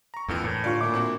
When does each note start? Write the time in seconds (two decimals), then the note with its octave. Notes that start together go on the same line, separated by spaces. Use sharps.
0.14 A#5 C#6
0.28 F2 A#2 D3 E3
0.43 A2 E3
0.64 G2 D3 F4 D5 C#6
0.81 A#2 E4 D6
0.94 C4 D4 F#4